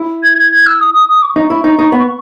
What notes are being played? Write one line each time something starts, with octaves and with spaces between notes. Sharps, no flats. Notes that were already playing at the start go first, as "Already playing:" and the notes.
Already playing: E4
G#6
G#6
G#6
E6
D#6
D#6
D#6
C#6
D#4
E4
D#4
D#4
B3